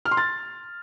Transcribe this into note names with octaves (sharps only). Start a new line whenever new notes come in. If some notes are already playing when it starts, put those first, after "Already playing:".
F6
C6
A6